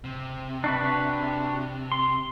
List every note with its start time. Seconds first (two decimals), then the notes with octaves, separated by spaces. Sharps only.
0.04 C3
0.64 D4 F#4 B4
1.92 C6